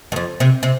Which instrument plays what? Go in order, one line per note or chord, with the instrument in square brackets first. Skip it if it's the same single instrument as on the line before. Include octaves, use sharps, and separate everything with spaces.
[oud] G2
F2
C3
C3